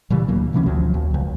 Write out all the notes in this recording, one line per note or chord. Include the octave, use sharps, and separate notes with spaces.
A#2 C#3 E3 G3
D2 F#3 A#3
D2 B2 E3 C#4
D2 F3 F#3
D#2
C#2